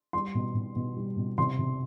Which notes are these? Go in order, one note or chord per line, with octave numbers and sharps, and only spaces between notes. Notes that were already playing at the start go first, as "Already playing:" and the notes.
G3 C6
B2
B2
B2
G3
B2
C3 C6
C3